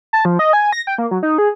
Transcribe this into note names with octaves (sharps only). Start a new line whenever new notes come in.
A5
F3
D#5
G#5
A#6
G5
A#3
F#3
D#4
G#4